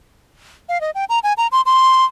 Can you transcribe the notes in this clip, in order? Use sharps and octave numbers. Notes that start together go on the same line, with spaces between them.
F5
D#5
G5
A#5
G#5
A#5
C6
C6